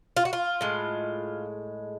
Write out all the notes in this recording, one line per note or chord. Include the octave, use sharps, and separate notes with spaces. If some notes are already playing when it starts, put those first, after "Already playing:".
F4
F#4
F4
A2 G#3